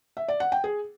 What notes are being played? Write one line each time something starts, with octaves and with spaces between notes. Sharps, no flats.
E5
D5
F#5
G5
G#4